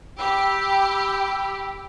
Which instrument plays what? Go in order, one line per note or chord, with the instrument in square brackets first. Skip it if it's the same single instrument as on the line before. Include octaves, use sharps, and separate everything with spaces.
[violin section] G4 [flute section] G5 B5 E6